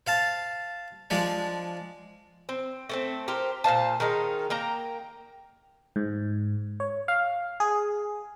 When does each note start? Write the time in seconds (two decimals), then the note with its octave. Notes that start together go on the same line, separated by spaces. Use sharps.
0.07 C5 F5 A5
1.10 F3 G#3 D4 C5
2.49 C4
2.89 A3 A#3 C4
3.28 G4 A#4 C5
3.64 A#2 C5 F5 A5
4.00 D#3 G#3 D#4 A#4
4.50 A#3 G5 A#5
5.96 G#2
6.80 C#5
7.08 F5
7.60 G#4